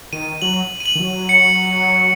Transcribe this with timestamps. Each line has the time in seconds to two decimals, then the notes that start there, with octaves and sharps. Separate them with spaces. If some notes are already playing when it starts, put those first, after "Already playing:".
0.13 D#3 D#7
0.42 F#3 F#7
0.80 D#7
0.86 F#7
0.95 D#3
1.00 F#3
1.29 C#7